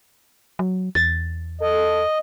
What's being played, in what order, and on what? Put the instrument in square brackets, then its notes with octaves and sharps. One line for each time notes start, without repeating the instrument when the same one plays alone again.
[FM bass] F#3
[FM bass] E2 [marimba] A6
[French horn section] A4 [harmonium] D#5